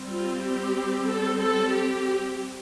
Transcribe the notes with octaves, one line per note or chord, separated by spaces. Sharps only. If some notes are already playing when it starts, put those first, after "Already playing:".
Already playing: G3 C4
F4
G4
A4
A4
G4